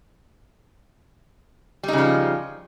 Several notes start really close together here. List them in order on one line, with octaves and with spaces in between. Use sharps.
G3 D#4 C#3 F3